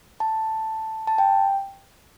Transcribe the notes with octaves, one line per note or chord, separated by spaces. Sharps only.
A5
A5
G5